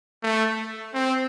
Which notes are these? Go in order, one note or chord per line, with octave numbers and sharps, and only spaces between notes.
A3
C4